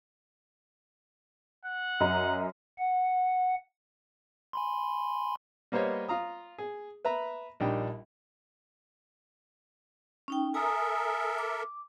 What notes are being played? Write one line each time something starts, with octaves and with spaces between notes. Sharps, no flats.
F#5
F#2 D#5 A#5
F#5
G#5 B5 C6
G3 A#3 B3 C5 C#5 D#5
F4 F5 A#5 D#6
G#4
B4 E5 A#5 B5
A#1 G3 D4 D#4 G5
C#4 D#4 G5
A4 A#4 E5 G#5 A#5 D#6
D6